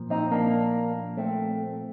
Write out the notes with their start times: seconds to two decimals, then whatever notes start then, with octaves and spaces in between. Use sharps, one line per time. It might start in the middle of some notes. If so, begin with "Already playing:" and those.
Already playing: A#2 F3
0.10 C4 D#4
0.32 A#3 D4
1.17 A3 C4